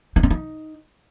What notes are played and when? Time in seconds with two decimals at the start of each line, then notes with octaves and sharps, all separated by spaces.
0.16 D#4
0.23 C4
0.31 D#4